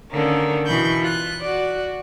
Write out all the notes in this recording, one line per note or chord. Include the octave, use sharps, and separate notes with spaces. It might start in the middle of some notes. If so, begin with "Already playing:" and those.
D3 D#3 A#3 C#4
B2 E3 B5 C#6 G6
F4 F#6
F#4 D5